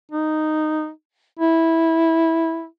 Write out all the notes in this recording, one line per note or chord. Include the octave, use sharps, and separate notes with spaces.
D#4
E4